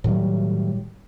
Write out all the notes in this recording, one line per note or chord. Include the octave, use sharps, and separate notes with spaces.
A2 D#3 F#3 G3